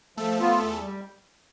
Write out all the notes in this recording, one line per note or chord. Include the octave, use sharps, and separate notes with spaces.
F3 A3 A4
B3 F4
E2
G3